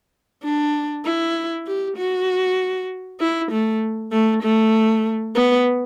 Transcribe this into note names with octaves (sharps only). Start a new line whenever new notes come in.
D4
E4
G4
F#4
E4
A3
A3
A3
B3